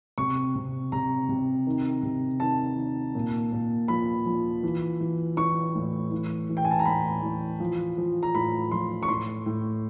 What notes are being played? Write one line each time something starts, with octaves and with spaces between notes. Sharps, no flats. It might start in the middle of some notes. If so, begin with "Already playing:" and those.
C3 C#6
C3
C3 A#5
C3
D#3
C3
D#3 A5
D#3
A#2
A#2
F3 B5
F3
E3
E3
E3 C#6
A2
E3
E3
G5
G#5
A5
A#5
A2 B5
E3
F3
F3
A#5
A2 B5
F3 C6
C#6
A2 C6
A2